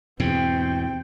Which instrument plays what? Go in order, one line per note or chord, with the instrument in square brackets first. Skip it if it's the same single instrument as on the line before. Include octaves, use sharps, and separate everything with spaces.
[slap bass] E2 G#2 B2 [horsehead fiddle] C4 G5